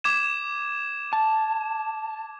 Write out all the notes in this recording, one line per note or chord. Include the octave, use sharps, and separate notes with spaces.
D6 G#6 E7
A5